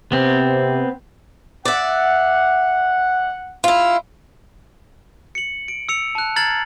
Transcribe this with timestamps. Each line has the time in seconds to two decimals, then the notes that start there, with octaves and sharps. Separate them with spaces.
0.12 C3 B3 C4
1.65 D5 E5 F#5
3.64 E4 F4
5.35 C#7 F#7
5.68 D7
5.89 E6 C#7 F7
6.15 A5 F#6
6.36 A#5 F6 G#6 A6 C7 F#7